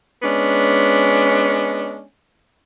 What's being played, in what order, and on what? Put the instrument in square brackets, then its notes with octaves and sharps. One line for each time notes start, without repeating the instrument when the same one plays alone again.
[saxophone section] G#3 B3 C#4 D4